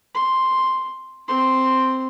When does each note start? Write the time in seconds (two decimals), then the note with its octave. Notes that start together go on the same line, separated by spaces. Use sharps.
0.15 C6
1.28 C4 C6